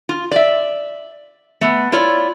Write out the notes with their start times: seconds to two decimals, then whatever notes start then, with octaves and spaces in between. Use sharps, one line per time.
0.09 F4
0.31 D5 E5
1.61 A3 B3
1.92 E4 F4 C#5 D5